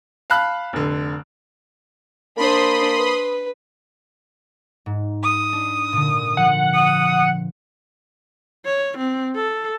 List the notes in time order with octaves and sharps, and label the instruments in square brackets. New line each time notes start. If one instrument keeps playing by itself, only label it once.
[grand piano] F5 A5 B5 F#6
F1 D3
[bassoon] A#3 [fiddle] D4 C5 [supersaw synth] B5 C6 D#6
[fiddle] B4
[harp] G#2
[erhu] D#6
[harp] D4
A#2 D3
[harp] F3 [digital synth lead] F#5
[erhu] D#6
[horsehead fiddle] C#5
C4
A4